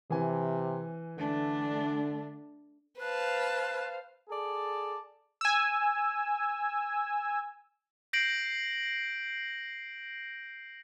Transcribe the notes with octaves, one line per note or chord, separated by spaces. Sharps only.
C3 E3 G#5
D3 A3 D4
B4 C5 F5 A5 F#6
G#4 A4 D5 A5
G#5 E6
G6 A#6 C7 D7 F#7